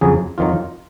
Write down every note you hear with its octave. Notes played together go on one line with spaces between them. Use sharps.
F2 C#3 F#3 G#4
F2 D#3 F#3 F4